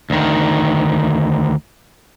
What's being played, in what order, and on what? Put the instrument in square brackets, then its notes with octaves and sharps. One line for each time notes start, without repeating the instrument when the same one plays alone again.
[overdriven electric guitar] D2 D#3